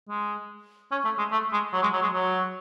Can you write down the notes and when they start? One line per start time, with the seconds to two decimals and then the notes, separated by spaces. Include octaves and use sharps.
0.09 G#3
0.91 C#4
1.05 A3
1.18 G#3
1.32 A3
1.52 G#3
1.73 F#3
1.83 G#3
1.93 F#3
2.03 G#3
2.14 F#3